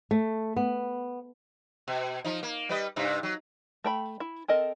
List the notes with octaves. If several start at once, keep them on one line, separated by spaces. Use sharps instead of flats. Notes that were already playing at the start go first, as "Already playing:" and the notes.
A3
B3
B2
F3 D#4
A#3
G3 B4 D#5
G2 C3 D#4
F#3
A3 G5 B5
E4
C4 A4 A#4 D#5